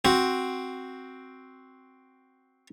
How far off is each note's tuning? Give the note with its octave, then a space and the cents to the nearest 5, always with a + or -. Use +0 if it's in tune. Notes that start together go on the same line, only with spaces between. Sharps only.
C4 +0 F#4 +0